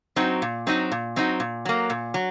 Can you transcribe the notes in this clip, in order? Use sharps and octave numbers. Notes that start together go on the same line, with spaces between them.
F#3 C4 D#4 F#4
A#2
F#3 C4 D#4 F#4
A#2
F#3 C4 D#4 F#4
A#2
F#3 A#3
A#2
F#3